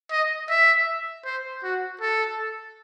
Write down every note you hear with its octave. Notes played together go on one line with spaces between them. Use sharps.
D#5
E5
C5
F#4
A4